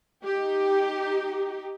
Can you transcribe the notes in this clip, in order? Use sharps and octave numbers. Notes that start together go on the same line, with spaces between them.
D#4 G4